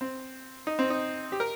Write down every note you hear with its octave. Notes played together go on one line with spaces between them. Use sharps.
C4
D#4
C4
D#4
G4
A#4